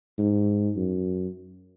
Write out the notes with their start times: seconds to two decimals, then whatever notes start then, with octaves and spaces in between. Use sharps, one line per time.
0.19 G#2
0.77 F#2